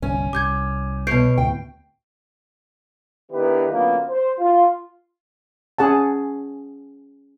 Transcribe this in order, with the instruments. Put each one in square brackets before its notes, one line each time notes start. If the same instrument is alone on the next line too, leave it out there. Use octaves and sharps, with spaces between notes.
[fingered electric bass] G1 C2 [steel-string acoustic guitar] C#4
[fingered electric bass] C2 [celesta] D6 G6 G#6
[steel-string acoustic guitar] B2 C#5 [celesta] G6 C7 D7
[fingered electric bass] D2 A2 C3 [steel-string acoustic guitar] G5
[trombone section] D#3 B3 D4 E4 G4 B4
D3 F#3 A#3 B3 C#4 F4
C5
F4
[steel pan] C#4 G#4 F#5 A5